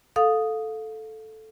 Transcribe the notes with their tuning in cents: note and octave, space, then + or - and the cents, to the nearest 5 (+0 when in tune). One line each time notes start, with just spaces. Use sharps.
A4 -5 F5 +20 D#6 +0